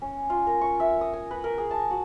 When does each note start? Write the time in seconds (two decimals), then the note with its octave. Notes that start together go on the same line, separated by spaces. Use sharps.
0.02 C#4
0.30 F4
0.47 A#4
0.61 C#6
0.80 E5
1.01 D#6
1.13 G#5
1.31 B4
1.44 A#4
1.58 G#4
1.71 A5
1.91 F#4